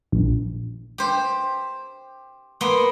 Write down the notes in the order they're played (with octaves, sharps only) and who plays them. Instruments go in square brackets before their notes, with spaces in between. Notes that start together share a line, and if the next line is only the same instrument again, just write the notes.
[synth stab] A#1
[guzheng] G4 C5
A#3 B3 C6